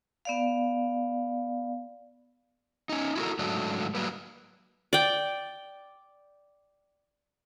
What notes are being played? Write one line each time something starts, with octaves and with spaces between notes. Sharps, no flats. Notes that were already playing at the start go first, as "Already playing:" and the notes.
B3 D5 F5
C#4 D#4
E4 F#4 A4 A#4
G#2 D3 F#3 A3 D4
F#3 G3 A#3 B4
D5 G5